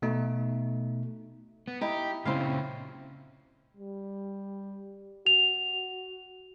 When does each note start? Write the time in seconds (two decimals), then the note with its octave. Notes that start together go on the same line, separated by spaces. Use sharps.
0.02 B2 A3 D#4
1.68 B3
1.81 D#4 E4 G4
2.25 A#2 C#3 C4 E4 F5
3.77 G3
5.26 F#4 F7